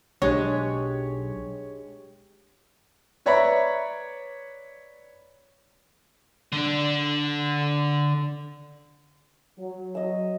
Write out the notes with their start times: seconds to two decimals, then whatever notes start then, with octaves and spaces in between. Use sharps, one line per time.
0.22 B1 G#3 D4 G4 G#4 C#5
3.26 B4 C#5 D5 E5 A#5 B5
6.52 D3 D4
9.58 F#3
9.95 D#5 E6